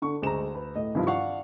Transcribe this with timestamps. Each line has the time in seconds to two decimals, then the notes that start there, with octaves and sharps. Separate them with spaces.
0.02 D3 C#6
0.22 D2 G#3 A#5 E7
0.55 B4
0.76 A2 D#5
0.95 G2 C3 D#3 F3 E4 F4
1.07 D4 F5 F#5 C#6